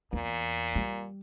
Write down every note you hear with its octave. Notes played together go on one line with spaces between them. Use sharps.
E2 A#2
G3